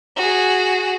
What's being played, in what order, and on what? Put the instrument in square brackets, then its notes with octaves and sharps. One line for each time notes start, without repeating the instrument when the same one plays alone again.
[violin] F#4 G#4